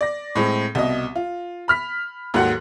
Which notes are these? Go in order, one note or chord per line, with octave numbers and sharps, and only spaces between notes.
D5 A#6
A2 G#3 C4
C2 B2 D#5
F4
B5 F6 B6
D#2 G#2 F#3 A4 F#5 F#6